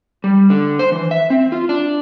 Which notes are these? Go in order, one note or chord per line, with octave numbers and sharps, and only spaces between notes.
G3
D3
C5
E3
E5
C4
F4
D4